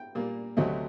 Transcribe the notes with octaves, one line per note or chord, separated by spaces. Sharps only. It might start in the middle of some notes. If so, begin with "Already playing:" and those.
Already playing: G5
A#2 G3 A#3
D2 C3 F#3 A3 C4 D#5